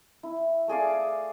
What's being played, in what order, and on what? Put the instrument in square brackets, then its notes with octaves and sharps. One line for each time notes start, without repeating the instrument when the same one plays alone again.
[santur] E4
A3 G#4 D5 F5